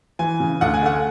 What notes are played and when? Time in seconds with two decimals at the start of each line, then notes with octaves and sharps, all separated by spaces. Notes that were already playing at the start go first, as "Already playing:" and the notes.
0.19 E3 G#5
0.40 C#3
0.61 D2 F#5
0.74 G#5
0.83 A3 F#5